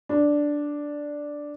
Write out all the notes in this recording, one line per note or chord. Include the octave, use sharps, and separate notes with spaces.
D4